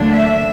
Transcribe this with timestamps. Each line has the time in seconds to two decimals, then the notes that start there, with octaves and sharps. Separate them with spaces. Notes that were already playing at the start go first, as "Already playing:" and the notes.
Already playing: D2 D3 F#3 A#3 D4
0.13 E5